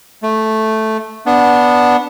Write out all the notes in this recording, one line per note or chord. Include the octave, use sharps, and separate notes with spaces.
A3
B3 D4